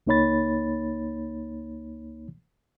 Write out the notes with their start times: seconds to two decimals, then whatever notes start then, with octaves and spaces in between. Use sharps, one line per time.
0.07 C#2 A#3 D#4 C#5 B5 A6